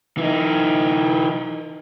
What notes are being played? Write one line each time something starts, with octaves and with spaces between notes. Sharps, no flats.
E3 D#4